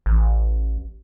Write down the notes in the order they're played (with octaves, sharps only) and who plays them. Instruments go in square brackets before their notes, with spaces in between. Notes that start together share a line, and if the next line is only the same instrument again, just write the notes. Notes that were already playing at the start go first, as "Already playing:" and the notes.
[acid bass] A1